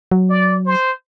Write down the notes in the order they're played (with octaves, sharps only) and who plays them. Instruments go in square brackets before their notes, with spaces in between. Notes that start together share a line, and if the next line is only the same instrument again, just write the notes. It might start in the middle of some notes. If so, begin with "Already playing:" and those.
[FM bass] F#3
[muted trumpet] D5
C5